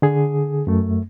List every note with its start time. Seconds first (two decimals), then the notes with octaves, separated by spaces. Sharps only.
0.02 D3 G#4
0.67 F#2 A3